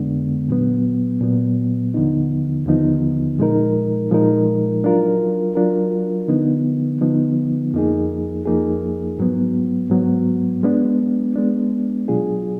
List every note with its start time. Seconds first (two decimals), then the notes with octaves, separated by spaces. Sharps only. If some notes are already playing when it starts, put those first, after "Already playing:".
Already playing: F2 D3 G#3 B3 D4
0.49 A#2 F#3 B3
1.21 A#2 F#3 B3
1.94 D#2 D3 F3 B3 D#4
2.66 D#2 D3 F3 B3 D#4
3.39 A#2 F3 G#3 D#4 A#4
4.11 A#2 F3 G#3 D#4 A#4
4.84 F#3 D4 F4 A#4
5.55 F#3 D4 F4 A#4
6.28 D3 F3 B3 D#4
7.01 D3 F3 B3 D#4
7.74 F2 F3 A#3 D#4 G#4
8.46 F2 F3 A#3 D#4 G#4
9.18 G#2 F#3 B3
9.90 G#2 F#3 B3
10.63 G#3 B3 D4
11.36 G#3 B3 D4
12.08 B2 F#3 D4 F4 G#4